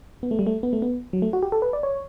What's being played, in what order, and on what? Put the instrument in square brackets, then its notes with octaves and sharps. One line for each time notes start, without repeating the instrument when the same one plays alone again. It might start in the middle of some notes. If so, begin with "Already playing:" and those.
[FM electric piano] B3
A3
G3
A3
B3
A3
B3
F#3
A3
F#4
G4
A4
B4
D5
C#5